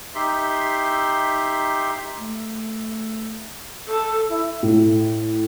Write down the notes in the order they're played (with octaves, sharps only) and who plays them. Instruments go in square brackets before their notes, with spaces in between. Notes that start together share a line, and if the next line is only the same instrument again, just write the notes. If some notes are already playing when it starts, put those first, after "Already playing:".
[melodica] D#4 G4 E5 C6
[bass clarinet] A3
[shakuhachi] A4
E4
[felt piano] A2